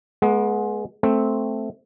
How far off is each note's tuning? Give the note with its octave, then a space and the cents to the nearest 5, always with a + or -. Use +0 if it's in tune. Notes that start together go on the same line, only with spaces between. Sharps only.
G#3 +25 B3 -20
A3 +0 C4 +0